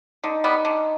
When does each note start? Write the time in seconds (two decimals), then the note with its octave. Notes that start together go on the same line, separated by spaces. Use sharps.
0.24 D3 D#4
0.44 G3 B3
0.65 D3